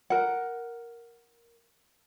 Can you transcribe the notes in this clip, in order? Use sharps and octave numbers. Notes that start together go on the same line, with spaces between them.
A#4 F#5